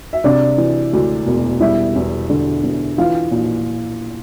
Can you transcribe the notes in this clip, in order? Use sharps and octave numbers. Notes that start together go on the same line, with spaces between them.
E5
C3 D4 D5
E3
D2
E1
G3 E4 E5
E2
D3
E2
E3 F4 F5
A#1